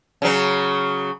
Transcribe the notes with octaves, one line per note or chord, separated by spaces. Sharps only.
C#3 F#3